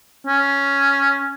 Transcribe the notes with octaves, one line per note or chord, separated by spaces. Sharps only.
C#4